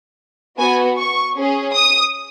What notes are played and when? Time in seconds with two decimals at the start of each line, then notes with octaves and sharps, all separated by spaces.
0.58 B3 F#4 G#5
0.97 C#6
1.36 C#4 G#4
1.75 D#6